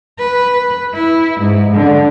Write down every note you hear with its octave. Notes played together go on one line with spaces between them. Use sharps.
B4
E4
G#2
D3